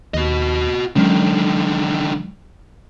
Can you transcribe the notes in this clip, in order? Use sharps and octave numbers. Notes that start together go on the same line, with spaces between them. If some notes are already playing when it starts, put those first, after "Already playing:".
D#2 F#4 D#5
D3 D#3 F#3 G#3 C#4